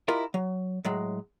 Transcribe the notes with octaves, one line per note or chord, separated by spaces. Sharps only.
E4 F4 G4 A#4 D#5
F#3
A2 F#3 G#3